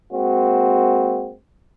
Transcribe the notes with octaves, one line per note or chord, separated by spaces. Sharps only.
G#3 A#3 C4 F#4